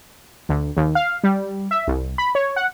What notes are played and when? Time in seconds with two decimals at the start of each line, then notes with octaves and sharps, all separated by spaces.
0.49 D2
0.77 D#2
0.95 F5
1.24 G3
1.71 E5
1.87 C2
2.18 B5
2.35 C#5
2.56 F#5